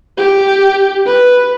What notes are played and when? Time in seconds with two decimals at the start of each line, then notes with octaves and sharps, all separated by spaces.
0.18 G4
1.06 B4